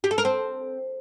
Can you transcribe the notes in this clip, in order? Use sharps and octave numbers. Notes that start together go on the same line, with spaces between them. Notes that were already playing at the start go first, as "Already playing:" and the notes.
G4
A4
A#4
C4